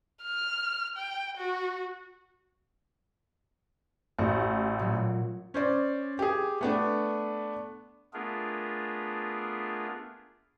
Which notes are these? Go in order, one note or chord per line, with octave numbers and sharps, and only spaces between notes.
F6
G5
F#4
A1 F#4
A#2 F#3
C#4 C5 D5
G4 G#4
A3 B3 D4
A3 B3 D4 F4 G#4 A#4